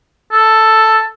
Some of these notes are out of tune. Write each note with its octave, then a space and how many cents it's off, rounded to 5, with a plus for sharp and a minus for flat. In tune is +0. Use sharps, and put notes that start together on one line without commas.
A4 +5